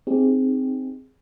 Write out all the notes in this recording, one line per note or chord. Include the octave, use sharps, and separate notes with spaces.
C4 D#4 G4 G#4